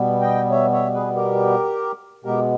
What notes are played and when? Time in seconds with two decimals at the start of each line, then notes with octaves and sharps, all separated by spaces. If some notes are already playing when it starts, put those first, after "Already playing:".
Already playing: B2 G3 B3
0.21 D#5 G5
0.51 C#5 E5
0.72 C#5 E5
0.94 G#4 B4
1.16 G4 A#4
2.25 B2 G#3 B3 G4 A#4